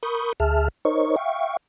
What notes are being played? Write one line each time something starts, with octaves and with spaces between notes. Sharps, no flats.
A#4 B5 C#6 D#6 G6
D2 G#4 E5 A5 F6
D#4 A#4 C5 C#5 D#5 C#6
E5 F5 G5 C#6